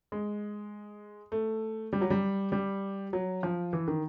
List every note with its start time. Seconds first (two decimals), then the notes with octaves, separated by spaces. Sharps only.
0.12 G#3
1.32 A3
1.93 G3
2.01 F#3
2.10 G3
2.52 G3
3.13 F#3
3.43 F3
3.73 E3
3.88 D#3